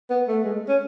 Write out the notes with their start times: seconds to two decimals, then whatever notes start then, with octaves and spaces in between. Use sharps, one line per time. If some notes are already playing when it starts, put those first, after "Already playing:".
0.10 B3
0.28 A3
0.44 G#3
0.68 C#4